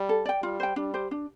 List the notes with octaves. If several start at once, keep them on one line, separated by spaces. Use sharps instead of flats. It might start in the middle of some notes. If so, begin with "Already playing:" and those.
Already playing: G3
A4
D5 G5
G3 F4
C5 G5
G3 D4
G4 C5
D4